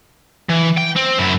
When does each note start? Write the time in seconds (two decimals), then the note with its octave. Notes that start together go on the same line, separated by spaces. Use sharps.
0.50 E3
0.78 G5
0.96 C4
1.18 F#2 E4